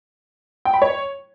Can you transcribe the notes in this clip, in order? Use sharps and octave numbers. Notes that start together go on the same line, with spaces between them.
G5
B5
C#5